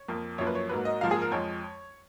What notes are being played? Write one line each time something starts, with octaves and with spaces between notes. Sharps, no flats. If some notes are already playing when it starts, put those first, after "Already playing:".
Already playing: C#5
F2 F3 A#3
F#2 F3 A#3 C#5
B4
C#5
G#2 F#3 A#3 B4
D#5
G#2 F3 A#3 F5
G#4
A#4
F2 F3 G#3 C#5